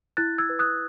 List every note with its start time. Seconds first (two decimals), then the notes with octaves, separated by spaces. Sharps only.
0.17 E4 F#6 A6
0.38 E6 G#6
0.49 B4
0.59 D#6 F#6